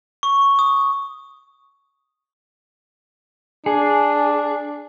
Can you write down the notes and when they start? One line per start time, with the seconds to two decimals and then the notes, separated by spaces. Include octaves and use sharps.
0.23 C#6
0.59 D#6
3.66 D4 G#4